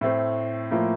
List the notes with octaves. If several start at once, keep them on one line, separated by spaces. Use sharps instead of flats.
A2 A3 C4
A2 F3 A#3